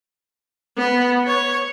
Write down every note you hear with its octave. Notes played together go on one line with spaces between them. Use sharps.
B3
C#5